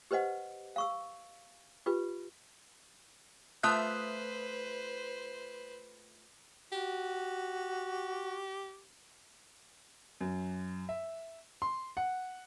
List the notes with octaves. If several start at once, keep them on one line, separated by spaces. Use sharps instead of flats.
G4 B4 C5 D#5 F#5
F5 C#6 E6
F4 G4 B4
A3 F4 B4 C5 E5 D#6 F#6
F#4 G4
F#2
E5
C6
F#5